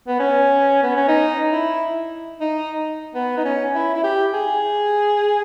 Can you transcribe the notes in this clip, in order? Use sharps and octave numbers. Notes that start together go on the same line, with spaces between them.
B3
C#4
B3
C#4
D#4
E4
D#4
B3
D#4
C#4
E4
E4
G4
G#4